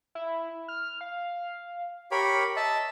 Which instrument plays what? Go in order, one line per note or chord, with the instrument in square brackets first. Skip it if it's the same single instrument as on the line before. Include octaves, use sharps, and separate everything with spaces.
[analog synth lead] E4
F6
F5
[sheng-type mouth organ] G4 C#5 B5 [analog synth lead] A#4
[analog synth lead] D#5 [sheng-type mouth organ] E5 A5